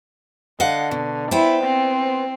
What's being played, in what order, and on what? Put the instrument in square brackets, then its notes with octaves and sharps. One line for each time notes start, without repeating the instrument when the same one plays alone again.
[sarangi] D3 [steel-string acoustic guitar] D#5 F5 F#5
[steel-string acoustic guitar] B2
[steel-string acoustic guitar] B3 C5 G5 [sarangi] E4
[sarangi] C4